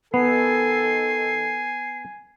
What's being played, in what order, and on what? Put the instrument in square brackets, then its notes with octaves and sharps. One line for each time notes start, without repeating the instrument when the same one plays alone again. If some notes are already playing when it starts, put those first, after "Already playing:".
[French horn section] D#3 A4 [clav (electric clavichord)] B3 [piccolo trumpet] G#5 [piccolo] C7